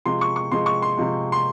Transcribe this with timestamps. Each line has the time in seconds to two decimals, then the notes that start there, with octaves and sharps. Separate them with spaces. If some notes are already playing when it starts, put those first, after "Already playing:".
0.05 C3 F3 G#3 C6
0.21 C#6
0.36 C#6
0.51 C3 F3 G#3 C6
0.66 C#6
0.82 C6
0.97 C3 F3 G#3
1.32 C6